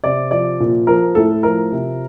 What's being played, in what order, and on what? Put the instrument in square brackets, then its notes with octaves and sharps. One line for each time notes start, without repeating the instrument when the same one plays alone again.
[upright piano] C3 D5
F3 D5
A#2
F3 A#4
A2 A4
F3 A#4
C3